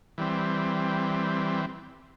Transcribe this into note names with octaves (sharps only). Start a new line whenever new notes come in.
E3 G3 C4